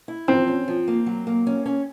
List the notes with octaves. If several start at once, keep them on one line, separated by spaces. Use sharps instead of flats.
E4
F3 C4
C#4
F3
A#3
F#3
A#3
C#4
C#4